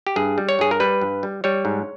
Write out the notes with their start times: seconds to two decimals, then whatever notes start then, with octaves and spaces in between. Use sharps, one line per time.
0.07 G4
0.16 G2 G#4
0.38 G3
0.49 C#5
0.59 G2 G#4
0.71 A#4
0.80 G3 B4
1.01 G2
1.23 G3
1.44 G3 C#5
1.65 G#2